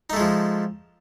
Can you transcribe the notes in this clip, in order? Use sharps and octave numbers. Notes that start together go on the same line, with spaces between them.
F3 G#3 A3 D#4